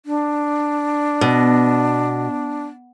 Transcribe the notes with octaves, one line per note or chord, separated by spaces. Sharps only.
D4
B2